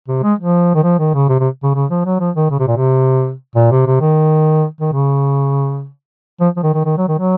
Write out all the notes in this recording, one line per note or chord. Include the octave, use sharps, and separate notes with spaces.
C3
G#3
F3
D#3
F3
D#3
C#3
C3
C3
C#3
C#3
F3
F#3
F3
D#3
C#3
C3
A#2
C3
A#2
C3
C3
D#3
D#3
C#3
F3
F3
D#3
D#3
D#3
F#3
D#3
F#3